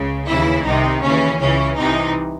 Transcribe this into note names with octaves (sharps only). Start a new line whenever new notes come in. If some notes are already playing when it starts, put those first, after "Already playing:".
Already playing: C#2 C#3
D#2 C#3 E3 E4
C2 C3 D#3 D#4
D#2 C#3 E3 C#4
C#2 C#3 E3 C#4
C2 C3 E3 D#4